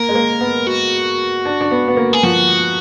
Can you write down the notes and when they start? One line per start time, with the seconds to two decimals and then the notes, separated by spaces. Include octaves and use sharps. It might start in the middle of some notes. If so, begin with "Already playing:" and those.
Already playing: A#3 A#4
0.09 G#3
0.15 A#3
0.41 B3
0.67 F#4
1.45 D4
1.61 D4
1.71 B3
1.88 B3
1.97 A#3
2.13 G#4
2.23 F3 F#4